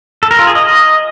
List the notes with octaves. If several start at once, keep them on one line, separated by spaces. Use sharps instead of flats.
A4
A#4
F4
G#4
D#5